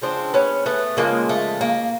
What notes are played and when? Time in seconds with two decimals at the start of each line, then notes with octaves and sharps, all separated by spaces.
0.02 C#3 F3 G#3 C4 D4
0.34 B3 C#4
0.66 A3 B3
0.97 C#3 F3 G#3 A#3
1.29 A3
1.61 A#3